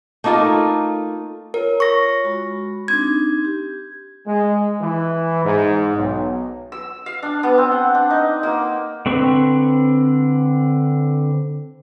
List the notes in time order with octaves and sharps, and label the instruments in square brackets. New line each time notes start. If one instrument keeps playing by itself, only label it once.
[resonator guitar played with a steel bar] A3 A#3 D#4 F4 A4
[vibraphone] F4 C#5 [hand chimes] A#4
[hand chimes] C#6 A#6
[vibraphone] G#3 F#4 B5
[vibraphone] C4 D4 D#4 [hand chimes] G#6
[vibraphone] G4
[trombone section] G#3
E3
G#2
B1
[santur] E6
F5
D4
B3
C4
F#5
D4
D#4
A#3
[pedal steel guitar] D3 C4 B4 C#6